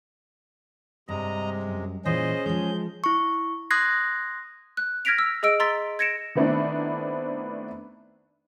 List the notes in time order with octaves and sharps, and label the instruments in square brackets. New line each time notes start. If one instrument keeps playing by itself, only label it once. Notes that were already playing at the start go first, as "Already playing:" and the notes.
[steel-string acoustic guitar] G2 [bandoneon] C3 G#3 [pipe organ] D#5 A#5
[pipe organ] F#2
[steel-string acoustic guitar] A#2 E3 [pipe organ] C#4 G#4 [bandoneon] C5 D#5
[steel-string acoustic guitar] F3 G#3 [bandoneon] G6
[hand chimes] E4 C#6
C6 D#6 F#6 G#6 A#6 C7
[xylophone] F#6
F6 G#6 A#6 B6 D7 F7
E6
G#4 D#5 E6 D7
A#5 C6 E6 A6 B6 G7
G#6 A#6 C#7 D7 E7
[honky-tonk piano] D#3 A3 B3 C4 D4 E4